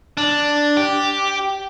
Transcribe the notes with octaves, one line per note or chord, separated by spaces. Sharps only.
D4
G4